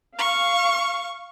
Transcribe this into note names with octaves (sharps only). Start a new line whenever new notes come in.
F5 C#6